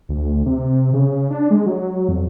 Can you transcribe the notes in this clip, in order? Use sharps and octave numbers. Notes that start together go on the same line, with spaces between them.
D2
C3
C#3
D4
G#3
F#3
F2